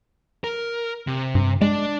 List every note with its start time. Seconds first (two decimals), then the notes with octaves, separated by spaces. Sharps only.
0.44 A#4
1.07 C3
1.35 G2
1.62 G#3 D4 D5